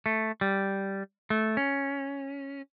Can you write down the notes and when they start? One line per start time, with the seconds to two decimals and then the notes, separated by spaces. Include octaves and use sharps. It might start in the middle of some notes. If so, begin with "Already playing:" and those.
0.06 A3
0.41 G3
1.30 A3
1.57 C#4